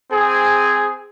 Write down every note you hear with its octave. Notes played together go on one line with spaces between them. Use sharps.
C4 G#4 G#5